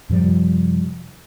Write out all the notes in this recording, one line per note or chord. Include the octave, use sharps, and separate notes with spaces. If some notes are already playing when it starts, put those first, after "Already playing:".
F#2 C3 F3 G3